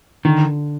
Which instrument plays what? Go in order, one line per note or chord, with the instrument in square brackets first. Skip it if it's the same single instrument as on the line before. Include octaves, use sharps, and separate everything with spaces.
[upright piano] D3 [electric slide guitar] D#3